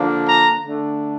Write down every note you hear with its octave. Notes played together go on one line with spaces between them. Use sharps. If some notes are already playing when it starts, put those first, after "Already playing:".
Already playing: D3 F3 A#3 D4
A#5
D3 A3 D4